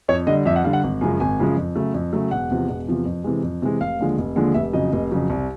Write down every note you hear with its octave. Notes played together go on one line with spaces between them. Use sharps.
F2 C#5
D3 G3 D#5
F2 E5
F#5
D3 G3 F5
F#5
G#1
F#2 C#3 F3 G#3
G#1 G#5
F#2 C#3 F3 G#3
F2
C#3 F#3 A3
F2
C#3 F#3 A3
E1 F#5
E2 C3 F3
E1
E2 C3 F3
F2
C3 E3 G#3
F2
C3 E3 G#3
F1 F5
D#2 D3 F3 G#3
F1
D#2 D3 F3 G#3
F1 E5
F2 C#3 F#3 D#5
F1
F2 C#3 F#3
C2